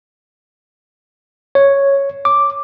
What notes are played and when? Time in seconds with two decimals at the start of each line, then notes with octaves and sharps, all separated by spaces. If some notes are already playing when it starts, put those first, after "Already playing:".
1.55 C#5
2.25 D6